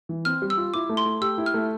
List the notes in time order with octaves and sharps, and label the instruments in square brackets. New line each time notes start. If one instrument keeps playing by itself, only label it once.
[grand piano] E3
[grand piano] C4 [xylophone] F6
[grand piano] G3
[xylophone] E6
[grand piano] F4
[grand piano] E4 [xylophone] D6
[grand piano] A3
[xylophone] C6
[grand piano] A3
[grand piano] G4 [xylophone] E6
[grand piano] E4
[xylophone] F6
[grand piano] A3